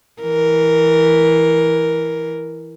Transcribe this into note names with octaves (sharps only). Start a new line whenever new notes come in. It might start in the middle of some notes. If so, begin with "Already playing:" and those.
E3 A#4